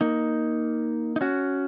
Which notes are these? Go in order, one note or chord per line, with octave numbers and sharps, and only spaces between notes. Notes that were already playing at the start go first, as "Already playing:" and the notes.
A#3 D#4
D#4
C#4 F#4